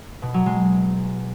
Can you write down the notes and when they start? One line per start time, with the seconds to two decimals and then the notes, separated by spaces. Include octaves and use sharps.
0.22 B2
0.34 F#3
0.46 G#3